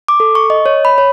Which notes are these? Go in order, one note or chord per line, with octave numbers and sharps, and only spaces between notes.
D6
A4
C#6
D#5
C#5
B5
C#5